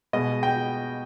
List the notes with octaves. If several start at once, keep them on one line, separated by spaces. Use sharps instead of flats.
B2 G#3 D#5
G5